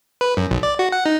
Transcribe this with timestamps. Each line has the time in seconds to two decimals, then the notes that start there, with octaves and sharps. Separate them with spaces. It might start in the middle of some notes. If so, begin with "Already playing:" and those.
0.21 B4
0.37 F#2
0.51 B1
0.63 D5
0.79 F#4
0.92 F#5
1.06 D#4